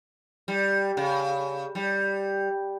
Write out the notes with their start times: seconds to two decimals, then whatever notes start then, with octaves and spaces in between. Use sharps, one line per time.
0.48 G3
0.97 C#3
1.75 G3